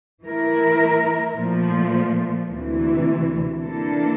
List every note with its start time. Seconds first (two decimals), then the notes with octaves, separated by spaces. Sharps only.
0.22 E3 A3 E4 A#4
1.35 A#2 F3 A3
2.48 D2 C3 E3
3.61 E3 A#3 D4 A4